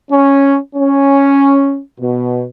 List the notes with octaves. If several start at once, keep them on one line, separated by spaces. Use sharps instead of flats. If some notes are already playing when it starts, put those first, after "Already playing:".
C#4
C#4
B2